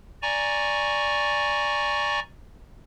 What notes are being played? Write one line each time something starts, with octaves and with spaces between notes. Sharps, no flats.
D5 G#5 A#5 C#6